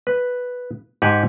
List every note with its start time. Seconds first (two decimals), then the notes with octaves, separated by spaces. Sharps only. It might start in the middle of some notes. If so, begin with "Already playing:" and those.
0.07 B4
1.02 G#2 G4 F#5 G#5